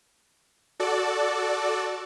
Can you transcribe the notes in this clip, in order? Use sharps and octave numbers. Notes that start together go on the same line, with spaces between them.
F#4 A4 D5